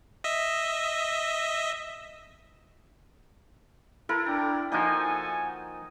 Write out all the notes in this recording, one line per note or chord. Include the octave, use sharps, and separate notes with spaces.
D#5 E5
E4 A4 A#4
D4 G5 A#5
F3 A#3 D#4 F#4 A4 D#5 G5 G#5